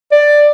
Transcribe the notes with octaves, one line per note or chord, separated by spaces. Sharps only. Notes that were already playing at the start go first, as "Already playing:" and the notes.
D5